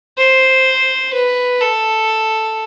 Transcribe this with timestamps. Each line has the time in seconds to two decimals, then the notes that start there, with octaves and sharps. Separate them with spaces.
0.18 C5
1.14 B4
1.61 A4